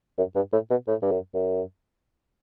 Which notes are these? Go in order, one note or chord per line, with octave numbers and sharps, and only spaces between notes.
F#2
G2
A2
B2
A2
G2
F#2
F#2